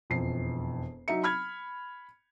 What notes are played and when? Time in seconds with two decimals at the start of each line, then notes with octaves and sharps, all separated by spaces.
0.10 E1 F2 C7
1.08 F#3 D#4 E5 C#7
1.24 B5 F6 G#6